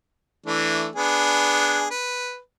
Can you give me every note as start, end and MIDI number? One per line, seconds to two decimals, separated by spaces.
0.46 0.88 52
0.46 0.88 57
0.46 0.88 62
0.96 1.88 59
0.96 1.88 62
0.96 1.88 68
1.91 2.39 71